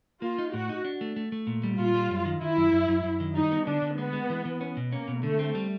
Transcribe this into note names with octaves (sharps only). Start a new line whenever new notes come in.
A#3 F4
D#4
A2 F#4
D#4
D4
A3
A3
A3
A#2
G3
A#2 F4
G3
F#2
D#3
D#3 E4
F#2
F#2
F#2
F#2
D#3
G3 D#4
B3
D3 D4
D3
G#3 B3
G#3
E3
E3
C#4
B2
A#3 C#4
B2
D3 A3
C4
G3